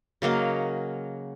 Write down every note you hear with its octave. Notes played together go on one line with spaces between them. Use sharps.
C#3 F#3 A#3 D#5